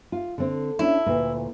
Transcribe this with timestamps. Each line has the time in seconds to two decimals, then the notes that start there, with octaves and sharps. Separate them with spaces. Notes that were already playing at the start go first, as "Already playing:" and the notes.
0.12 F4
0.38 D3 C4
0.79 C#4 D4 E4
1.06 D2 A#2 B4